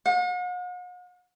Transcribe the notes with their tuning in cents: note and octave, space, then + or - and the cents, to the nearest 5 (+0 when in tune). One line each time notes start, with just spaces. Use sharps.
F#5 -45